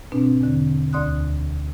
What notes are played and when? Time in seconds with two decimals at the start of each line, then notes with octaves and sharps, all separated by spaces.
0.12 G#2 B2 C4 D4
0.41 E2 D3
0.93 D2 D5 C6 D#6 F#6